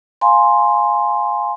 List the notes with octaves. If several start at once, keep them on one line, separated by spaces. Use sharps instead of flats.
F5 G#5 A#5 C6